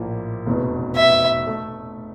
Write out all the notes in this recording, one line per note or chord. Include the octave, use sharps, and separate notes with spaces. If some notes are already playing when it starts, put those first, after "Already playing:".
Already playing: A#1 A2 F3 A#3
F1 E2 B2
E5
A3